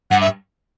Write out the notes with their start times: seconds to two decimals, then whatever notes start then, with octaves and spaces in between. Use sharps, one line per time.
0.11 G2 F#5
0.21 E5